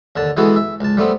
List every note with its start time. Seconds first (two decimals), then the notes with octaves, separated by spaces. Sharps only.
0.16 D#2 D3 A5
0.37 E3 G#3 B3 E4 F#4 A4
0.56 E5
0.81 C#2 A5
0.97 G3 A3 B3 C4